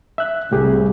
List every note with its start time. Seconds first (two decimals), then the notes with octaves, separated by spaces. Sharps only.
0.18 E5 F#6
0.52 C2 A2 G4 G#4